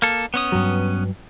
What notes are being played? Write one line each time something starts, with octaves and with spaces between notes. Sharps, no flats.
A#3 A4
B3 C#4 D#6
G2 F#3